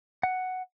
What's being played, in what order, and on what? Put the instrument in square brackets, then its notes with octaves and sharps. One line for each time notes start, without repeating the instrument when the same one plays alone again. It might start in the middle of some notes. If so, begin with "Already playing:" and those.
[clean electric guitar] F#5